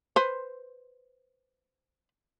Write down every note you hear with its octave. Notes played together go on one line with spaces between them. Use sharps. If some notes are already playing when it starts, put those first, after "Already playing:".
B4 C5